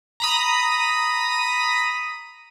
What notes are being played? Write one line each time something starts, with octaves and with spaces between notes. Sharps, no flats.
A#5 B5 D#6